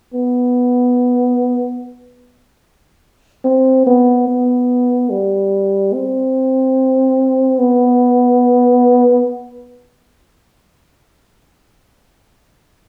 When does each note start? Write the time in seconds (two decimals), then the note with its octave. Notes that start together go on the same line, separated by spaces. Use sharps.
0.14 B3
3.45 C4
3.87 B3
4.28 B3
5.10 G3
5.94 C4
7.59 B3